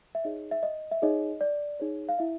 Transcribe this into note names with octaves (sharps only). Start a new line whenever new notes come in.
E5
D#4 G#4 C#5 D#5
E5
D#5
E5
D#4 G#4 C#5 D#5
D5
D#4 G#4 C#5
F5
E4 E5